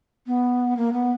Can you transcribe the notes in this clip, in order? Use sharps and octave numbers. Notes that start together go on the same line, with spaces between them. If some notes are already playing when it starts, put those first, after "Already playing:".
B3
A#3
B3